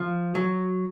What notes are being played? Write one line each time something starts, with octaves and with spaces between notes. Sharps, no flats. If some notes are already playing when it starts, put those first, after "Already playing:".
Already playing: F3
F#3